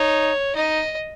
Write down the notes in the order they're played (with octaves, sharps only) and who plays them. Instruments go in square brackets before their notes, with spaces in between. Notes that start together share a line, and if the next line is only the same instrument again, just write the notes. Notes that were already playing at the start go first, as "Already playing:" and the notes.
Already playing: [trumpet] D#4 [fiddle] C#5
[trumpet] D#4 [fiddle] D#5